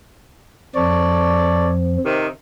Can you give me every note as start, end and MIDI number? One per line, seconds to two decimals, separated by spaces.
0.75 1.97 41
0.75 1.97 53
0.75 1.70 69
0.75 1.70 73
0.75 1.70 74
2.04 2.26 48
2.04 2.26 51